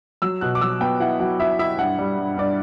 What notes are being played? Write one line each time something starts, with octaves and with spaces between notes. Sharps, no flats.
F#3 E6
B2 F#6
D6
F#3 E6
B3 G5
E4 F#5
F#3 F#5
E4 E5
E4 E5
G2 F#5
G3
G2
G2 D5